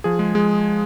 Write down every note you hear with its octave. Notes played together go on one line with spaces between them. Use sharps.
F3 G#4
G#3
G#3